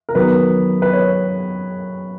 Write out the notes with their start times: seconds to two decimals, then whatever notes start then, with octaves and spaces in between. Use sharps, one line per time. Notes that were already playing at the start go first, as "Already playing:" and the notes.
0.09 A#4
0.15 D#3 F#3 B3 B4
0.82 B4
0.93 C#5